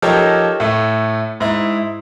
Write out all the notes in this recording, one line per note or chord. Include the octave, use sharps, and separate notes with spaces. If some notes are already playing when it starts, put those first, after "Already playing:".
F3 D#4 G4 A4 A#4 C#5
A2 A3
G#2 E4